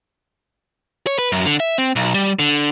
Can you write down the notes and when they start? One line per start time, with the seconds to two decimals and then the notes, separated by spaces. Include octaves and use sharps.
1.07 C#5
1.19 B4
1.32 F#2
1.46 D3
1.60 E5
1.78 C4
1.96 B1
2.14 G3
2.39 D3